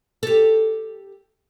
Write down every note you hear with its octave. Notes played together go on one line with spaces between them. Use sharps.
G4 A4